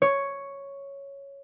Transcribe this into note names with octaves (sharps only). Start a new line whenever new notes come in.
C#5